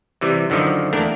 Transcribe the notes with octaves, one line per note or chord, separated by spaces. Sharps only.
C3 E3 G3
F#2 D3 D#3 F3
E2 A3 A#3 D4 A#4